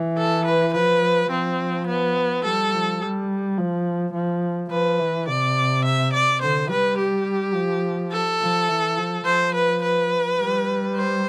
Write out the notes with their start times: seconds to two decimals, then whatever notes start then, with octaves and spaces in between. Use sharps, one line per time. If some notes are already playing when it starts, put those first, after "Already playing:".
Already playing: E3
0.18 A4
0.45 B4
0.74 F3 B4
1.30 F3 C4
1.87 B3
2.44 G3 A4
2.72 F3
3.01 G3
3.58 F3
4.14 F3
4.71 F3 B4
4.99 E3
5.28 C3 D5
5.85 E5
6.13 D5
6.42 D3 C5
6.70 G3 B4
6.98 G4
7.55 F3
8.12 A4
8.41 F3
8.69 E3
8.97 F3
9.25 F3 C5
9.54 B4
9.83 B4
10.39 G3
10.96 C5